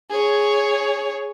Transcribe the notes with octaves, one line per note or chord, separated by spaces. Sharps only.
G#4 C#5